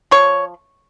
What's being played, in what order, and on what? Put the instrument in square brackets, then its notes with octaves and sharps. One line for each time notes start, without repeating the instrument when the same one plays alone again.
[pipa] F3 C#5